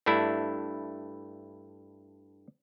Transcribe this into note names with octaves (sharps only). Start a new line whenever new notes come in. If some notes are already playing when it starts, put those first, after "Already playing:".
G2 A3 D4 E4